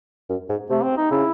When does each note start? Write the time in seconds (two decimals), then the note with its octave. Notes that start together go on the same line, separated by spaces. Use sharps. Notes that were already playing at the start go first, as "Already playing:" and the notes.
0.30 F#2
0.49 G#2
0.70 C3 A3
0.83 C4
0.97 D#4
1.11 C#3 E4